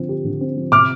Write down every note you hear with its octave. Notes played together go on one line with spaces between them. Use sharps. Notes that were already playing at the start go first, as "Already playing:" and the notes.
Already playing: D3 F3 C4
G4
D3
C4
F3
C3 D6 F6